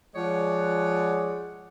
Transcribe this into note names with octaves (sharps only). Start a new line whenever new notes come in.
F3 G#3 C#5 D5 F#5